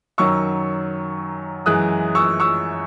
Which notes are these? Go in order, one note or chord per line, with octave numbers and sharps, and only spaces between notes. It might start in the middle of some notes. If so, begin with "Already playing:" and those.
F#2 D#3 F#3 C#6 E6
F#2 E3 G#3 D#6 F#6
C#6 E6
C#6 E6